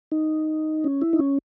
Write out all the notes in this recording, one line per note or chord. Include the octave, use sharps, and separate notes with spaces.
D#4
C#4
E4
D#4
C#4